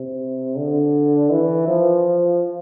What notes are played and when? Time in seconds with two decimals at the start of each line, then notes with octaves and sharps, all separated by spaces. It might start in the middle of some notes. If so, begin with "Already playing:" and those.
Already playing: C3
0.57 D3
1.31 E3
1.68 F3